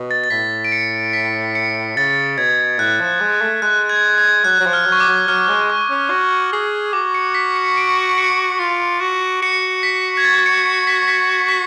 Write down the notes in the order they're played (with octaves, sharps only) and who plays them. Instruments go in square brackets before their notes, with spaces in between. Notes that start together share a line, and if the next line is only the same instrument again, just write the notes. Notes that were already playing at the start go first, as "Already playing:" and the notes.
Already playing: [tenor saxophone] B2
[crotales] A6
A6
[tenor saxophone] A2 [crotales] B6
[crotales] D7
C#7
B6
C#7
[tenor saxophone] C#3 [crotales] A6
[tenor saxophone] B2 [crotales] G#6
[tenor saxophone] A2 [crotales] F#6
[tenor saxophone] F3
G#3
A3
[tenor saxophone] G#3 [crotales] F#6
[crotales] G#6
G#6
[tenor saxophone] F#3 [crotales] F#6
[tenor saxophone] F#3
F3
[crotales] F6
[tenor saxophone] F#3
[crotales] C#6
D6
[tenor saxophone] F#3
[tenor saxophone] F#3 [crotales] F6
[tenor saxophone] G#3
[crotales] C#6
[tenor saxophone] C#4
F#4
G#4
[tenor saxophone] F#4 [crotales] D6
[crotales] C#7
B6
C#7
D7
C#7
[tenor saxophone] F4
F#4
[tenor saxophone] F#4 [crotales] C#7
[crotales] B6
G#6
A6
C#7
C#7
B6
B6
B6